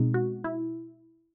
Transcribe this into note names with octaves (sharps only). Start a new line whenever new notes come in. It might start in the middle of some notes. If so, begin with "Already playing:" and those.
Already playing: B2 G#3 C4 D#4
F#4
E4